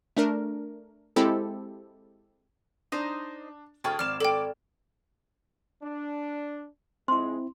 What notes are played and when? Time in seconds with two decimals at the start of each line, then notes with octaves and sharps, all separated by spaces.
0.17 A3 D4 A#4
1.16 G#3 C4 E4 G4 A4
2.92 D4 D#4 C5 A#5
3.84 D2 G#4 G5 A5 C#6 F6
3.99 G#1 D5 F5 F6 E7
4.20 A4 D5 G5
5.82 D4
7.08 F2 G#3 C4 E4 C6